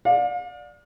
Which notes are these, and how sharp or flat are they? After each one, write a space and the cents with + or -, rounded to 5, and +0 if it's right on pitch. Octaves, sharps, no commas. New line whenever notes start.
D5 +5 F5 +40